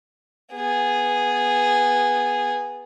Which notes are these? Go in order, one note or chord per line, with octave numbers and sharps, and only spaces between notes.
B3 G#4